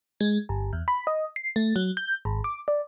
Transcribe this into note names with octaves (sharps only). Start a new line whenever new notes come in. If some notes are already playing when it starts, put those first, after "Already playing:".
G#3
G1
E2
B5
D#5
C7
A3
F#3
G6
G#1
D6
D5